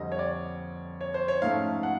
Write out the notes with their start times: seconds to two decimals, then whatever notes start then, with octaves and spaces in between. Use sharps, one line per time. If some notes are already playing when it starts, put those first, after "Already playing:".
Already playing: F2 D3 G3 C4 D#5
0.12 C#5
0.19 D5
1.01 C#5
1.14 C5
1.28 C#5
1.42 G#2 F3 A3 C#4 F5
1.83 F#5